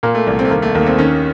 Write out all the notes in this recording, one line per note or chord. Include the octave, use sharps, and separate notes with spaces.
A#2 A#3
A3
C2
C4
A3
D#2 A#3
A3
D#2 A#3
C4
D#3 C#4